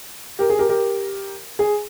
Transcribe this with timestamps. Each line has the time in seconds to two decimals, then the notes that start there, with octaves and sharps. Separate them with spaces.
0.39 G4 A#4
0.50 G#4
0.59 G4 A#4
0.69 G4 A#4
1.59 G#4